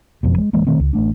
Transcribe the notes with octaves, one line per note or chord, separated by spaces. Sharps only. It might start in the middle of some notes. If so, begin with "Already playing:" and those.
F#1 F2 B2
G#3
D1 E3 G#3 A#3
B2 D#3 A3 C4
C#2
A1 A3 D4